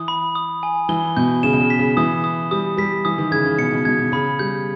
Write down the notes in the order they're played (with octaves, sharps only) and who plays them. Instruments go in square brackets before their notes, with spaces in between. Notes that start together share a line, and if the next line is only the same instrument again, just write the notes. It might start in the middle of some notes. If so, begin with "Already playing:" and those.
Already playing: [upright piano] E3 [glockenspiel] D#6
[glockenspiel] B5
D#6
G#5
[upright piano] E3 [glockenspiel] G7
[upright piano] B2 [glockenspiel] G6
[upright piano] C#3 [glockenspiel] E7
[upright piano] B2
C#3
[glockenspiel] B6
[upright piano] C#3
[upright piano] E3 [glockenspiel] D#6
[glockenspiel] D#6
[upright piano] G3 [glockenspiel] D#6
[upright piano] G3 [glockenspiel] B6
[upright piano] E3 [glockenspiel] D#6
[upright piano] D#3
[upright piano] C#3 [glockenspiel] G#6
[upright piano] C#3
[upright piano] B2 [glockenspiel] C#7
[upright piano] B2
[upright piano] B2 [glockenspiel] G#6
[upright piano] B2
[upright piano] C#3 [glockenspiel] B5
[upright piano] G3 [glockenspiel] G6